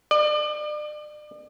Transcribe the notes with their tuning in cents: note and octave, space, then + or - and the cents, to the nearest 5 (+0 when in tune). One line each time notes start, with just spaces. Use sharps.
D5 +40